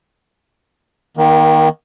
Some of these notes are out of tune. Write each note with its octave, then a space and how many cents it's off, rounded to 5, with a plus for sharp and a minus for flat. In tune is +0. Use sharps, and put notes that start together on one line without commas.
D#3 +15 A#3 +40